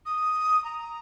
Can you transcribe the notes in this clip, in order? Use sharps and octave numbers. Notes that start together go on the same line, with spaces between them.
D#6
A#5